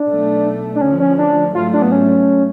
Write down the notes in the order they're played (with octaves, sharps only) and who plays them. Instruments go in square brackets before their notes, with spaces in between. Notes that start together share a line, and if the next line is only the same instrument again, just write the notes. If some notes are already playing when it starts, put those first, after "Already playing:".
Already playing: [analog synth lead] D4
[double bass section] B1 B2 A3
[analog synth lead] D4
[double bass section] D2 D3 F3 [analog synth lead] C#4
[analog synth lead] C#4
D4
[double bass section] G#2 F#3 A3 [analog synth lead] F4
[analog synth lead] D4
B3
C#4